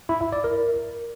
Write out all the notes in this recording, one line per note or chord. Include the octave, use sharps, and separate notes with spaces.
E4
E5
D5
A#4